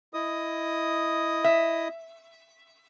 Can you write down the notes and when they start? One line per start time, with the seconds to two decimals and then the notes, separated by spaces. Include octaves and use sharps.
0.14 E4 D#5 D#6
1.44 E5